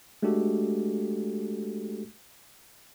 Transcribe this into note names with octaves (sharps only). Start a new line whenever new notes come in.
G#3 A3 D4 F#4 G4 A4